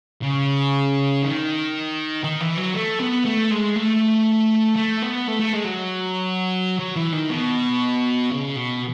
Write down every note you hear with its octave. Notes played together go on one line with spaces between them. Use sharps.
C#3
D#3
D#3
E3
F#3
A3
B3
A3
G#3
A3
A3
B3
A3
A3
G#3
F#3
F#3
E3
D#3
B2
C#3
B2